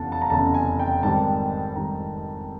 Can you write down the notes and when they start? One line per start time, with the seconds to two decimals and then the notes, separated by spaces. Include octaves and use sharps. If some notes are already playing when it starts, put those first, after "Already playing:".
Already playing: F1 E2 C#3 F5 F#5 A5
0.12 A5
0.22 A#5
0.30 F1 E2 C#3 A5
0.54 G#5
0.79 G5
1.03 G#2 D#3 G3 C4 A5
1.76 G#2 D#3 G3 C4 A#5